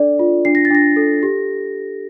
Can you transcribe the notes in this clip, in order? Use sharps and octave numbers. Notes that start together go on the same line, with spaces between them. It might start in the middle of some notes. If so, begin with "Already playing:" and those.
Already playing: D4 A4 D5
F4
D4 C7
A#6
A6
D4 A#6
A4
G4